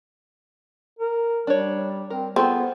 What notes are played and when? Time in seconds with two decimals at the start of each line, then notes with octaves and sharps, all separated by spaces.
0.99 A#4
1.47 G3 D4 C#5
2.10 C4 A#4
2.36 B3 C4 F4 G#4 A4